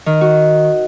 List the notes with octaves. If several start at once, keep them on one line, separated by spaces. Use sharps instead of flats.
D#3
F#4